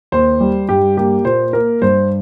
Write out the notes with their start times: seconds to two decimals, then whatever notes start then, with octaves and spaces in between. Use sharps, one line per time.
0.12 D#2 C5
0.40 G3
0.69 G2 G4
0.97 A#3 G4
1.25 A#2 C5
1.53 A#3 A#4
1.82 G2 C5